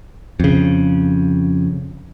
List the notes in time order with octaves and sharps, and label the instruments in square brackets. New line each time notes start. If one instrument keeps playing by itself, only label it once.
[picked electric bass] F2 C#3